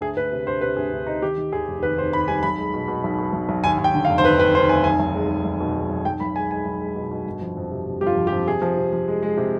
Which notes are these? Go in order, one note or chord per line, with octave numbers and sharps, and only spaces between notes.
D2 G#4
D2 B4
C3
D2 C5
C3 B4
D2 G#4
D2
C3 D#4
D#3 G4
D#3
D#2 G#4
F1
D#2 B4
F1 C5
D#2 B5
G3 G#5
B1 B5
G#3
B2
B2
B1
B2
B1
B1
D#2 G#5
D#2
G5
D3
F5
F1
C5
D#2 B4
D#2 B4
D#2 C5
F1 G#5
B1 G#5
B1
G#3
G#3
B1
B2
G#3
B1
B1 G5
B1 B5
G#3 G#5
G#3 G#5
B1
G#3
B2
B2
G1
F3
F2
C3
C3
G1 G4
F4
F2
G4
F2
C3 G#4
F3
C3
F3
G#3
G#3
C3